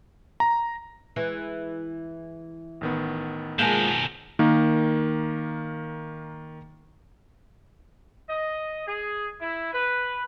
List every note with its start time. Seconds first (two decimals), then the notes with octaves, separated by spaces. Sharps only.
0.40 A#5
1.16 E3 G#3
2.81 A1 D#3 B3
3.59 B2 F3 G#3 A#3 A#4 G#5 A5 G6
4.39 D#3 A#3
8.29 D#5
8.87 G#4
9.41 E4
9.73 B4